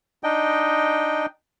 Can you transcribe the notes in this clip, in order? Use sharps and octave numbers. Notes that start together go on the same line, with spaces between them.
D4 D#4 D#5 G5